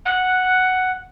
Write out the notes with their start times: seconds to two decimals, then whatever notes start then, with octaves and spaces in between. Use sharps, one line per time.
0.06 F#5